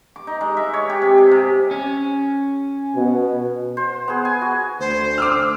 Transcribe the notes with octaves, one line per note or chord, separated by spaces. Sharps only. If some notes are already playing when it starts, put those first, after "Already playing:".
D6
D#4
G#3
E5
C#5
G4
C3
G#4
C3
C#4
B2
C5
B3 G#4
G#5
F#4
D2 C5
D6 E6 F6